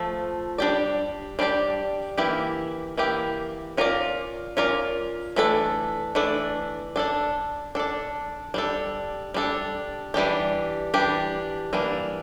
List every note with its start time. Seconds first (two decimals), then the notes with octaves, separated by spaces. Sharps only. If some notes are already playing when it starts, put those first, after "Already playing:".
Already playing: F3 A3 A4
0.58 G3 D4 G4 D5
1.39 G3 D4 G4 D5
2.18 E3 A#3 E4 G4
2.97 E3 A#3 E4 G4
3.77 C#4 F4 A#4 D5
4.57 C#4 F4 A#4 D5
5.36 E3 A3 D4 A4
6.15 E3 A3 D4 A4
6.96 D4 A4 D5
7.75 D4 A4 D5
8.54 G3 D4 A4
9.34 G3 D4 A4
10.14 E3 G3 D4 G4
10.94 E3 G3 D4 G4
11.73 E3 G3 A#3 D4